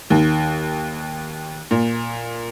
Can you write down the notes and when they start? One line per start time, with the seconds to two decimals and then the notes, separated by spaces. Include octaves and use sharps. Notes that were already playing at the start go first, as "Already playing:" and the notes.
0.10 D#2
1.71 A#2